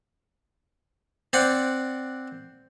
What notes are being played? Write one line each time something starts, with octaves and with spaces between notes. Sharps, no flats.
C4 D5 F#5